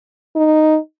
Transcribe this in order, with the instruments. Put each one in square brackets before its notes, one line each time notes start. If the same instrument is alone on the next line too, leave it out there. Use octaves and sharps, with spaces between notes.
[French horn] D#4